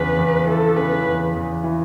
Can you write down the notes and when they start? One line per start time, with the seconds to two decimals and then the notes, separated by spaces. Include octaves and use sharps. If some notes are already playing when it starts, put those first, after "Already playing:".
Already playing: E2 C#3 B4
0.18 E2
0.47 E3 A4
0.76 C#3 B4
1.06 E2
1.35 E2
1.64 E3